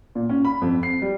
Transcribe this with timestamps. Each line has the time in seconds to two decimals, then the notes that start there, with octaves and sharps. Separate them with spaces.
0.15 A#2
0.29 C#4
0.45 B5
0.62 F2
0.83 C7
1.02 G3